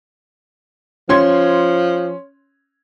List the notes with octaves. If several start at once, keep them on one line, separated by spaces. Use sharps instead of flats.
F3 C#4 C6 G#6